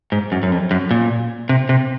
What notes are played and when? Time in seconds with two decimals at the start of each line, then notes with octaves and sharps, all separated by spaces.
0.12 G#2
0.32 F#2
0.43 F#2
0.52 F2
0.71 F#2
0.91 A#2
1.49 C3
1.69 C3